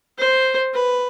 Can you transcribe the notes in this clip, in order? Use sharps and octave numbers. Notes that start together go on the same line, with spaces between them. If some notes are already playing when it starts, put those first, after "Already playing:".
C5
B4